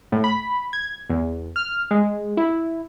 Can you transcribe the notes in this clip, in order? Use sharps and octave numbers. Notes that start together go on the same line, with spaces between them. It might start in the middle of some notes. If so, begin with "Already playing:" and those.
A2
B5
G#6
E2
F6
G#3
E4